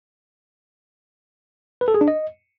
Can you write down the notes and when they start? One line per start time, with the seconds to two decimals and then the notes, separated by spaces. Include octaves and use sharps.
1.81 B4
1.88 A4
1.94 G#4
2.01 D4
2.08 D#5